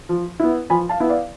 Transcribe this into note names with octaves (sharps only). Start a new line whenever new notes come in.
F3
B3 E4
F3 G#5 B5
F5 A5
B3 E4
D5 F5